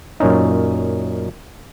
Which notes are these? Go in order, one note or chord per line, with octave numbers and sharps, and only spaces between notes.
F#2 A#2 C#4 D#4